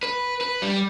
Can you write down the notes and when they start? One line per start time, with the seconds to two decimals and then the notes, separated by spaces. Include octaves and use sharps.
0.03 B4
0.41 B4
0.62 G3